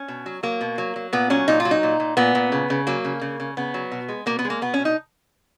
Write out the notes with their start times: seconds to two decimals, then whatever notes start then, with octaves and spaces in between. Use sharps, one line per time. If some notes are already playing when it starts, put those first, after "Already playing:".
Already playing: C#4
0.08 B2
0.26 F#3
0.43 F#3 A#3
0.61 B2
0.78 F#3
0.96 F#3
1.13 A#2 B3
1.30 F#3 C#4
1.48 A#2 D#4
1.60 F4
1.65 F#3
1.71 D#4
1.83 A#2
2.00 A#2
2.17 A#2 B3
2.35 A#2
2.52 C#3
2.70 C#3
2.87 F#3 A#3
3.04 C#3
3.21 C#3
3.40 C#3
3.57 C#3 B3
3.74 F#3
3.92 B2
4.09 G#3
4.26 B2 A#3
4.39 B3
4.45 G#3
4.50 A#3
4.62 B2 B3
4.74 C#4
4.79 B2
4.85 D#4